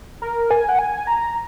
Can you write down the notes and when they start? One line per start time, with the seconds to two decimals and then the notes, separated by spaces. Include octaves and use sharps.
0.22 A#4
0.51 G#5
0.69 F#5
0.79 G#5
1.07 A#5